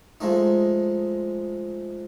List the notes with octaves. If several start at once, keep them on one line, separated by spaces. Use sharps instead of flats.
F3 G#3 A3 D#4